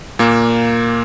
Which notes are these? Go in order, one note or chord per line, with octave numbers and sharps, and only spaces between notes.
A#2 A#3